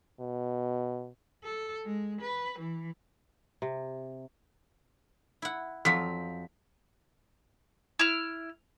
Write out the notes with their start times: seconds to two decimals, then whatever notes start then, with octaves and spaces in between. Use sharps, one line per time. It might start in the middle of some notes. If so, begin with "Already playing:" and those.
0.20 B2
1.44 A4
1.86 G#3
2.21 B4
2.59 E3
3.62 C3
5.42 E4 F#5
5.85 F2 F3 F#3 B6
7.99 E4 F6